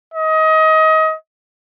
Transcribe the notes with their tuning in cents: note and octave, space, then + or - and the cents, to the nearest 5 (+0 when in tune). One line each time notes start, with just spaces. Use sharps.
D#5 +25